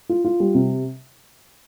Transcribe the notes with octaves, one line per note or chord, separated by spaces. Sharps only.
F4
F4
G3
C3